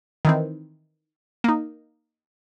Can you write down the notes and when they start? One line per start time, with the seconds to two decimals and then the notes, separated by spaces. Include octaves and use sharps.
0.25 D#3 E3 C4
1.44 A#3 D#4